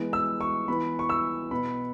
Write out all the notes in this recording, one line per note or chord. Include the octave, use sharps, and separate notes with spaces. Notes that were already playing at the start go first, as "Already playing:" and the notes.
Already playing: E3 G#3 B3
E6
C#6
E3 B3 B5
C#6
E6
B2 B3 B5